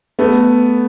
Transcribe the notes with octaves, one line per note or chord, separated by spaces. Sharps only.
A3 B3